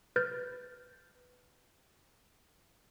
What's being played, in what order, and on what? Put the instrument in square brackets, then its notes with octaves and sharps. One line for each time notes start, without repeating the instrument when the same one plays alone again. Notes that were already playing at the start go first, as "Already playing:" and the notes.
[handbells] B4 F6 G6 A6